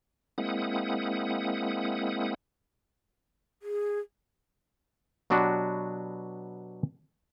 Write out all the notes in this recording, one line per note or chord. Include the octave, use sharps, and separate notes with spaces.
G#3 A#3 C4 E4 F#5 D#6
G#4
B2 F#3 B3 D4 F#4 G4